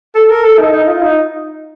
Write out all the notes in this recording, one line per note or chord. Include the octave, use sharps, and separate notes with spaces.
A4
A#4
A4
D#4
D#4
F4
D#4